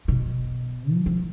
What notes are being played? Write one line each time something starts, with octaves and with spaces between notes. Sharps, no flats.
B2
F3
F3